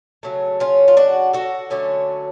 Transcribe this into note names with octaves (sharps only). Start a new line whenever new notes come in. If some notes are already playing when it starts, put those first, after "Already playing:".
C#3 F#3 A3
C#4 F4
F4
D4 F#4
F#4 A4
D3 F#3 A3 C#4